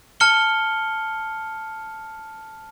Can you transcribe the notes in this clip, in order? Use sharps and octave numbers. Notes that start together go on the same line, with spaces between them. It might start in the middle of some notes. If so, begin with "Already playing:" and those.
A5 F6 C#7 G7